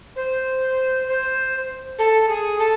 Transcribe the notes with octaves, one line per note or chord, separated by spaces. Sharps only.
C5
C5
A4
G#4
A4